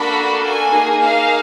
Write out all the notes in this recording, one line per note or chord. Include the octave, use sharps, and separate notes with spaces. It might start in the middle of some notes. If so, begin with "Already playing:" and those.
Already playing: A#3 D4 F#4 A4 B5
G#5
A#3 D#4 G#4
F5